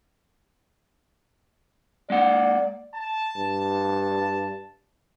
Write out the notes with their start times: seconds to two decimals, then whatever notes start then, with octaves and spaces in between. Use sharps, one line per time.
2.10 G#3 A#3 D5 F#5
2.95 A5
3.37 G2